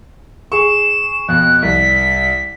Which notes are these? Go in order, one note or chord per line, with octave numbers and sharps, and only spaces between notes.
G#4 C#6 E7
F2 B2 F#6
C2 B6